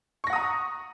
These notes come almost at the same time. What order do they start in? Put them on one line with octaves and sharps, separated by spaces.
C#6 A#6 F#5 D#6 A#5